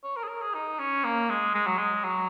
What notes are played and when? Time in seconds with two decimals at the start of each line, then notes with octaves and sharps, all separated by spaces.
0.03 C#5
0.16 A#4
0.24 G#4
0.29 A#4
0.42 G#4
0.54 D#4
0.79 C#4
1.04 A#3
1.29 G#3
1.55 G#3
1.67 F#3
1.78 G#3
2.04 F#3